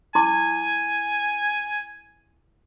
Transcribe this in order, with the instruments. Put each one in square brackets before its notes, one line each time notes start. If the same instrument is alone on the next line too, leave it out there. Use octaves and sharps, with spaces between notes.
[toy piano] E4 C6 D6 [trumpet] G#5